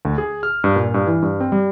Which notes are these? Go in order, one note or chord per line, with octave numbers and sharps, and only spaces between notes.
D2
G#4
F6
G2
A#2
G2
E3
G2
C4
G3